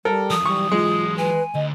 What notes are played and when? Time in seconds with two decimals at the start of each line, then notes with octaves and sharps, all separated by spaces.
0.05 G3 A4 A#4
0.31 E2 F3 D#6
0.46 E3 F#3 G3 C#6
0.72 G#3 F4
1.18 B4 G#5
1.55 D2 D#5